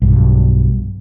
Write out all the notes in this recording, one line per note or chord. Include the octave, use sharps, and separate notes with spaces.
B1 G2